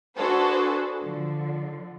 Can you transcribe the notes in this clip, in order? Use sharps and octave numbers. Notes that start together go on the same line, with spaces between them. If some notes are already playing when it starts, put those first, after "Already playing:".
D4 F#4 G#4 A4 B4 C5
D3 F3